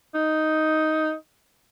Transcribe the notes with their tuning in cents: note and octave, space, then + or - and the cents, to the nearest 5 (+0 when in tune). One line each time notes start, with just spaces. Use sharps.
D#4 +5